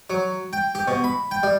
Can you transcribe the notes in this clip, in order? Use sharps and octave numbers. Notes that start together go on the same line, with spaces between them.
F#3
G5
G4
B2
B5
G5
G3